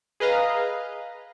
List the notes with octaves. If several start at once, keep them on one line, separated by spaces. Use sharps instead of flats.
G#4 B4 D#5 F5 A#5